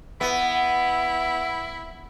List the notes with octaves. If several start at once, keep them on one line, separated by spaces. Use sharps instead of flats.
B3 E4